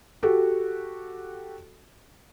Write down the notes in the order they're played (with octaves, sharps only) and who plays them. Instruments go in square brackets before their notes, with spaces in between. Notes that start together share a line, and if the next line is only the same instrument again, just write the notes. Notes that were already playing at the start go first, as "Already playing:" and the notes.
[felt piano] F#4 G4 A4